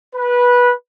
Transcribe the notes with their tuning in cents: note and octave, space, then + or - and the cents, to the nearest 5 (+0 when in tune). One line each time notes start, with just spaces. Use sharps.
B4 -15